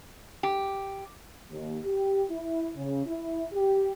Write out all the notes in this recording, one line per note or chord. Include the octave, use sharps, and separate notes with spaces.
G4
D#2
G4
E4
C#3
E4
G4